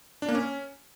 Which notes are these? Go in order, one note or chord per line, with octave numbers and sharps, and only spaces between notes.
D4
A#3
C#4